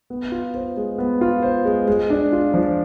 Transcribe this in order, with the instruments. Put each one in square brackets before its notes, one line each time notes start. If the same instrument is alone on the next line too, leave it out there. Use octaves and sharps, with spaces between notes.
[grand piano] B3
F4
C5
G#3
B3
F4
C5
G#3
G#3
D4
F4
F3